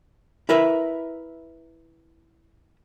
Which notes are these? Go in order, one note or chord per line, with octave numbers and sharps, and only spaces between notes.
E4 A#4 B4 E5